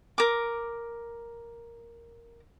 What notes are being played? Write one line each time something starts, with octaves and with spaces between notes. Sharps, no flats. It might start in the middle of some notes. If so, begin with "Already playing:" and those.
A#4 D6